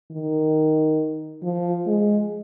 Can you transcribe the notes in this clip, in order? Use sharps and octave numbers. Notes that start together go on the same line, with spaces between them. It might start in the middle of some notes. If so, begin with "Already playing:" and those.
D#3
F3
G#3